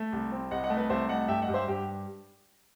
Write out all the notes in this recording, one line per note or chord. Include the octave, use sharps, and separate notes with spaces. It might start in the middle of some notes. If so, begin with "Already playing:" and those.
Already playing: A3 E5
C2
C4
C2 D#5 F#5
D#5 F#5
A3
B4 D#5
C2 C5 E5
A3 D#5 F#5
G2 E5 G5
D#5 F#5
G2
C5 E5
G2 G4